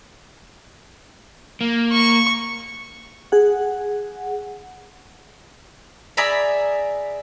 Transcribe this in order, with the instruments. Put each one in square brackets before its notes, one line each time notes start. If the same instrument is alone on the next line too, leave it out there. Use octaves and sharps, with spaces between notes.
[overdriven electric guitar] A#3
[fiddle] C#6
[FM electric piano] G#4 F#5
[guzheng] G#4 D5 E5 A#5 B5